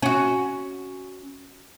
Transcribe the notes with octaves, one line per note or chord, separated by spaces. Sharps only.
C#4 F#4